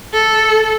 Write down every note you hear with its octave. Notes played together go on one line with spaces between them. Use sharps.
A4